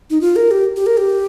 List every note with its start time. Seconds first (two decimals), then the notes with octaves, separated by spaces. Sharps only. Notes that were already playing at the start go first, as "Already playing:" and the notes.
0.10 D#4
0.21 F4
0.36 A#4
0.51 G4
0.76 G4
0.86 A#4
0.97 G4